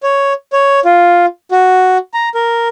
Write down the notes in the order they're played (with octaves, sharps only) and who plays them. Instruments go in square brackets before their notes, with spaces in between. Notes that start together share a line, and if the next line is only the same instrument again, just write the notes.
[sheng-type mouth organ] C#5
C#5
F4
F#4
A#5
A#4